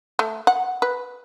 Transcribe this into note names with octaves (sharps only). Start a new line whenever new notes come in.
A3
F#5
B4